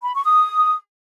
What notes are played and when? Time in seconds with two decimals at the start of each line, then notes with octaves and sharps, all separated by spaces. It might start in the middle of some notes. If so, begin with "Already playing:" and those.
0.04 B5
0.15 C#6
0.26 D#6